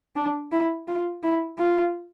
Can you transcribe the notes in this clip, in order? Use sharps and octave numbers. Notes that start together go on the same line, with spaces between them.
D4
E4
F4
E4
F4